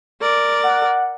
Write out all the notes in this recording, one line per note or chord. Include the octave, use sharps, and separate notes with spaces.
A#4 D5
F#5